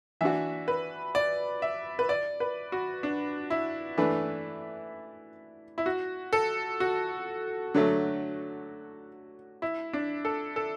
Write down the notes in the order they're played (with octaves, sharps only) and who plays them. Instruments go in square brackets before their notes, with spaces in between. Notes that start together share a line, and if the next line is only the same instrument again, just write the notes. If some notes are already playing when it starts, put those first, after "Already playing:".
[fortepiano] E3 D4 F#4 [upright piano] E5
[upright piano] B4
D5
E5
B4
D5
B4
F#4
D4
E4
[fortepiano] E3 A3 D4 B4
[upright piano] E4
F#4
A4
F#4
[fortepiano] D3 F#3 A3
[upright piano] E4
D4
A4
A4